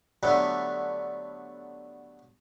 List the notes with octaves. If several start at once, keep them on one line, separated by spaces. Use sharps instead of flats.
D3 F#3 G3 A3 B3